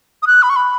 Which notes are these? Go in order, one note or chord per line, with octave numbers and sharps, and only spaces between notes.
D#6
F#6
B5
C#6
B5